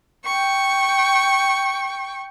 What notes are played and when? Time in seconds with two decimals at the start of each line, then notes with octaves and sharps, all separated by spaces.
0.25 G5 C#6